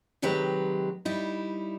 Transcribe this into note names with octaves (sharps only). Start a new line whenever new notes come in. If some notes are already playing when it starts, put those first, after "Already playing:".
C3 D#3 F#3 G#3 G4 B4
G3 D#4 E4